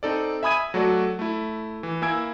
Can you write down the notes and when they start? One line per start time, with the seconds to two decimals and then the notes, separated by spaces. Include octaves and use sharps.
0.03 C4 D#4 A4 D5
0.43 E5 G#5 B5 D#6 G#6 D#7
0.74 F#3 A3 F#4 A4 D5
1.19 A3 E4
1.83 E3
2.02 A#3 E4 G#5 E6 G#6 D7